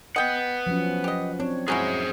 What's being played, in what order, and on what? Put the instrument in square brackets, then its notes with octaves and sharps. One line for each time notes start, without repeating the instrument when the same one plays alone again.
[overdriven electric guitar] B4 F#5 [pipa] D#5 G5
[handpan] F3 F#3 C#4
[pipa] G4 D#5
[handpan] C4 C#5 [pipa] D4
[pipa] F#3 C#4 E4 [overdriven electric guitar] G#4 C5